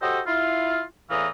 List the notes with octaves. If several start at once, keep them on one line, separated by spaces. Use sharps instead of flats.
F#4 G4 A4 C5 D#5
E4 F4
E2 A2 E3 F5 A#5 D#6